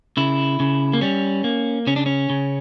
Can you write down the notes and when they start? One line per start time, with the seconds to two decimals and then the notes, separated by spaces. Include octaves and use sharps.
0.17 C#3 E4
0.60 C#3
0.93 A#3
1.01 G3 C#4
1.44 A#3
1.87 C#3 C#4
1.96 D4
2.06 C#4
2.30 C#3